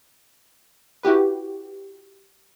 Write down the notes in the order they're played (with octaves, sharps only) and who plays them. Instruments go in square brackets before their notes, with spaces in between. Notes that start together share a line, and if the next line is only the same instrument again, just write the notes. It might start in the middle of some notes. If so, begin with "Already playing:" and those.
[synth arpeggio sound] E4 F#4 G4 B4